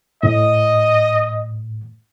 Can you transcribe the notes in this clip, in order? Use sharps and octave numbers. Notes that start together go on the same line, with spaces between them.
A2 D#5